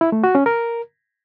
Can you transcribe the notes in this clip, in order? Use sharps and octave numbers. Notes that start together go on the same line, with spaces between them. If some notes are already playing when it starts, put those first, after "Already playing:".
E4
A3
F#4
C#4
A#4